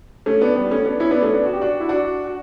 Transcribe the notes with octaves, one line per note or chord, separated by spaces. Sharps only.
A3 C#4
B3 D4
G3 B3
A3 C#4
B3 D4
C#4 E4
B3 D4
A3 C#4
B3 D4
F#4
G4
D4 F#4
E4
D4 F#4
F#4